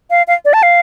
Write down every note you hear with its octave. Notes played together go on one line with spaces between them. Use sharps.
F5
F5
D5
A5
F5